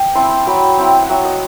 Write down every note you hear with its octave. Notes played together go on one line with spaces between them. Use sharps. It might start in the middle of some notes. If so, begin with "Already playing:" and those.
Already playing: G5
C4 E4 A5 C6
F#3 G5 B5
C4 E4
F#5
F#3 E5 G5
D#5 F#5